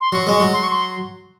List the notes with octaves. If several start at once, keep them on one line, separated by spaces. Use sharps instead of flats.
C6
F#3 C#6
G#3
F#3
C6
C#6
C6